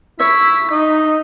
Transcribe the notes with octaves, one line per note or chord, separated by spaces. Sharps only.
E4 C#5 E5 B6
D#4 D#5